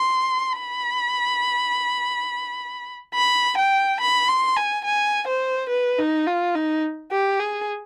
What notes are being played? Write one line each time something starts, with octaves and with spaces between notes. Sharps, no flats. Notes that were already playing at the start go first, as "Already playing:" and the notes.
Already playing: C6
B5
B5
G5
B5
C6
G#5
G#5
C5
B4
D#4
F4
D#4
G4
G#4